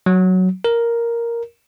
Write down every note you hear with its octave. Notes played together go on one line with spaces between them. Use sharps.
F#3
A#4